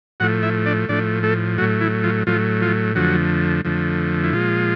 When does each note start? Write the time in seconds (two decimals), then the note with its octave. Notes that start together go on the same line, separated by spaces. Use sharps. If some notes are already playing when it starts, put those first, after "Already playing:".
0.20 A2 F3 A3 F#4 F#5
0.43 E4 E5
0.66 D4 D5
0.89 A2 F3 A3 D4 D5
1.23 A3 A4
1.58 A2 F#3 A3 F#4
1.81 E3 E4
2.04 F3 F4
2.27 A2 F3 F#3 A3 F4
2.61 F3 F4
2.95 F2 D3 F3 F#3 A3 F#4
3.65 F2 D3 F3 A3
4.24 E4
4.33 A#2 F3 G#3 F4